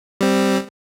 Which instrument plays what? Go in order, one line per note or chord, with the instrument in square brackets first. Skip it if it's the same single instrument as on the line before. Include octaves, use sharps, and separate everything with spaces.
[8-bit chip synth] G3 C4